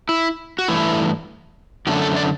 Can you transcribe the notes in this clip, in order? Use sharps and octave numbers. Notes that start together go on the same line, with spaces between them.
E4
F#4
G2 E3 A3 E4
F#2 D3 A3 D4 G4
A4
D5